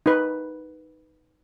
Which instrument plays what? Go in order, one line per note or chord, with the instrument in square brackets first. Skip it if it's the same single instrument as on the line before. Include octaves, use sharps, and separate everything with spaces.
[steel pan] D#4 B4